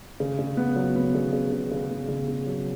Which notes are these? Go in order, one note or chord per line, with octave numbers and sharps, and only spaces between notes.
C#3
C#3
B3
F#3
B3
C#3
C#3
C#3
C#3
B3
C#3
C#3
F#3